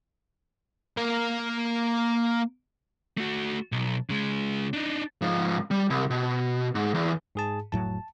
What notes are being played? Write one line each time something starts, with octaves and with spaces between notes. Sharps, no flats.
A#3 A#4
A3 F#4
B1
C#3 G#3
D4 D#4
G#2 F3
G3
C2
B2
G#2
E2
G#2 G#4 A5
F1 A2 F#3 A5